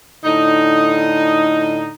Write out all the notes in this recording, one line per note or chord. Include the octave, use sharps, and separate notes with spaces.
A2 D3 D#4